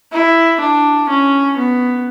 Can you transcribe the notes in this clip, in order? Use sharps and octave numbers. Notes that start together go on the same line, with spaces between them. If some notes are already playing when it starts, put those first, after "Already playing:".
E4
D4
C#4
B3